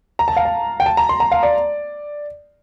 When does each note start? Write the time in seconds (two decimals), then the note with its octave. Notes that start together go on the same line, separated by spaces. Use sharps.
0.19 A#5
0.28 A5
0.37 F5
0.45 A5
0.80 G5
0.86 A5
0.97 A#5
1.09 C6
1.20 A#5
1.32 F5
1.43 D5